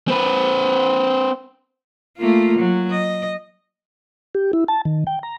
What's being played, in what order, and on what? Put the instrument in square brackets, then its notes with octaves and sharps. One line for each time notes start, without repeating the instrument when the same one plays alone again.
[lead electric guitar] C4 B4
[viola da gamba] A3 A#3 F4
F#3
D#5
[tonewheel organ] G4
E4
A5
D#3
G5
A#5